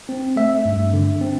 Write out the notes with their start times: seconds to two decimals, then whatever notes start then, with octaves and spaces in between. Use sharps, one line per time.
0.09 C4
0.36 A3 E5
0.65 G2
0.93 D3
1.21 C4